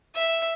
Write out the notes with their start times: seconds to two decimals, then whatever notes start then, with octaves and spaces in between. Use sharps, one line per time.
0.15 E5